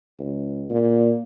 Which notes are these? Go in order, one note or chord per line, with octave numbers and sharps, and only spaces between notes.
C#2
A#2